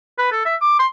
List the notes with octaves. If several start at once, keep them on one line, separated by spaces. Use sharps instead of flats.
B4
A4
E5
D6
C6